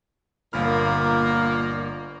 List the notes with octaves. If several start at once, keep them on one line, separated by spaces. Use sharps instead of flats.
G1 A#2 A#3 B5 F6